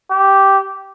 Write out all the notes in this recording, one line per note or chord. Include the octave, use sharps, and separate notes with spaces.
G4